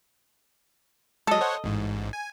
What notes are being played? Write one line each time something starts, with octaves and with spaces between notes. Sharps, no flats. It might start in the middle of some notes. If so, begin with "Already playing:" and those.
F#3 G#3 A4 D#5
C5 C#5 F#5
A1 G#2
G#5